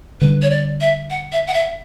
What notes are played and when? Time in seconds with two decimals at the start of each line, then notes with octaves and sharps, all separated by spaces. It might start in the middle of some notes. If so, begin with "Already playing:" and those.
0.21 D3 G3 D4 B4
0.42 C#5
0.50 D5
0.81 E5
1.10 F#5
1.32 E5
1.47 F#5
1.54 E5